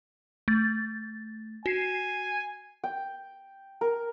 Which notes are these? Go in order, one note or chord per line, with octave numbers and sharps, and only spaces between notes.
A3 A6
F#4 G#5 C7
G5
A#4